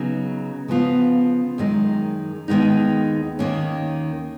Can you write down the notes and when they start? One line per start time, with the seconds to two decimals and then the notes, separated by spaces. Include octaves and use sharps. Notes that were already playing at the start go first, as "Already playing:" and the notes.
Already playing: C#3 F#3 B3 D#4
0.68 C#3 F3 B3 F4
1.58 F#2 D#3 G#3 D#4
2.48 D#2 D#3 G#3 B3 D#4
3.39 D#2 D#3 A#3 C#4